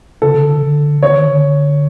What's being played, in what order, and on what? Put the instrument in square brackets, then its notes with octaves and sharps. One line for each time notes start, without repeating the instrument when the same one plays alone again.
[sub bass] C#3 [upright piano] A4
[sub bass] C#3
D3
D3
[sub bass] D3 [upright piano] C#5
[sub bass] D#3
D3